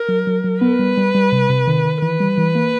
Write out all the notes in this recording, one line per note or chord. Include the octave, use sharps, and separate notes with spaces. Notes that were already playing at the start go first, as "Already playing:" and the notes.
Already playing: A#4
F#3
F#3
F#3
B3 B4
G3
G3
G3
C3
C3
D#3
D#3
E3 B4
G3
E3
A#3